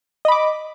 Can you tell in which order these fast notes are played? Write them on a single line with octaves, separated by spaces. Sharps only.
D#5 B5 D6